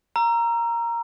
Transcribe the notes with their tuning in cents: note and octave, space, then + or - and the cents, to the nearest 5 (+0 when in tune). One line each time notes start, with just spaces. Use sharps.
A#5 +0 E6 +35